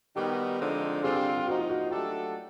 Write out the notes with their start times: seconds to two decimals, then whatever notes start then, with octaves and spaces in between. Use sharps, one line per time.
0.16 D#3 G3 B3 D#4 F#4 G4
0.60 D3 F3 G#3 C4 D#4
1.03 D3 G3 C4 F4 G#4
1.14 G4
1.37 G4
1.47 F3 A#3 D#4 F#4
1.58 F4
1.69 F#4
1.91 F#3 A3 D4 F#4 G4 A4